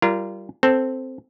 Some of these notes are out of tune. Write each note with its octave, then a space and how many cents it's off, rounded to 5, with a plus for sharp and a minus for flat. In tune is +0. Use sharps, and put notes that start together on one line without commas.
G3 -15 F4 -35 A#4 +0
C4 +0 A4 +0